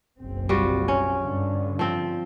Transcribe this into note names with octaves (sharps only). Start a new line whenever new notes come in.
F#1 B1 C4
G3 F4 F#4
C#4
G2 D3
F3 C4